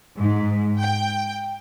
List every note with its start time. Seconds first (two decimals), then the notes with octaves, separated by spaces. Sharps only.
0.18 G#2
0.78 G5